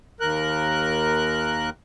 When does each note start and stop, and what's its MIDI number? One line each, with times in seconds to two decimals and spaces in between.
0.20 1.70 39
0.20 1.70 70
0.20 1.70 90